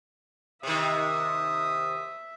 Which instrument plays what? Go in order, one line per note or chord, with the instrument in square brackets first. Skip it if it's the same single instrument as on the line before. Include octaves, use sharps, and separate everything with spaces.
[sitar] C3 D#3 [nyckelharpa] E5 [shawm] D#6